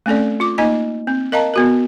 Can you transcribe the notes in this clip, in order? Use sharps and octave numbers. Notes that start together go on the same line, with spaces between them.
A3 C4 C#4 A4 D5
F4 D6
A#3 D#4 D#5 G#5
C4
A#4 D#5 F5 A5 A#5
B3 F#4 A#4